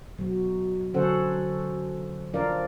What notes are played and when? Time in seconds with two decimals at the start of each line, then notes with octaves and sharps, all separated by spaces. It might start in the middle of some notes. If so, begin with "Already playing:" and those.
0.18 B2 F#3
0.94 D3 F#3 C#4 A4 C5 F#5
2.34 F3 D4 F4 A#4 D5 F5